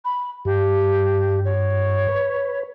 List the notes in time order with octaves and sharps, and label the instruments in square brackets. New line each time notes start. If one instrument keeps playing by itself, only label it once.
[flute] B5
[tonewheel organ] G2 [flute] G4
[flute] C#5
[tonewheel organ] B4